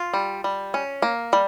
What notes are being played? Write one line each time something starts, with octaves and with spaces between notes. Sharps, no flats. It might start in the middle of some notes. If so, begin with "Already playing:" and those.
Already playing: F4
G3
G3
C#4
A#3
G3